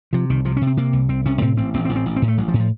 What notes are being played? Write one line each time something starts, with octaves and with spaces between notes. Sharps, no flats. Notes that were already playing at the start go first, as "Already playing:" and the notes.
C3 F3
C2 D#3
C3 F3
C#4
C3
C4
C3 A#3
C2
C2 C4
C3 C#4
A2 C4
A1 C4
A1 C4
C4
A1
C4
A1
C4
A2
A3
A1 F#3
F3
A2
F3